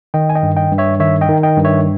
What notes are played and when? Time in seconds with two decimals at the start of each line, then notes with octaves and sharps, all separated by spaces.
0.14 D#3 D#5 G5
0.30 G#5
0.35 D#5 G5
0.43 G2
0.57 D#5 G5
0.71 G2
0.78 C#5 E5
1.00 D#3 C#5 E5
1.21 D#5 G5
1.29 D#3
1.43 D#5 G5
1.57 G2
1.65 C#5 E5